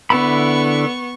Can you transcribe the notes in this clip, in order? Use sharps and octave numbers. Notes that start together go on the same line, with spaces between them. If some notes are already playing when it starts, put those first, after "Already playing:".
D3 B3 E4 B5 C#6